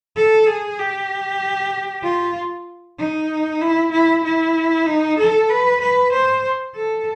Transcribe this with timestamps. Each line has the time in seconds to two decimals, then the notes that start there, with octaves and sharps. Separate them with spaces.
0.16 A4
0.47 G#4
0.79 G4
2.03 F4
2.99 D#4
3.61 E4
3.92 E4
4.25 E4
4.86 D#4
5.19 A4
5.50 B4
5.81 B4
6.13 C5
6.75 A4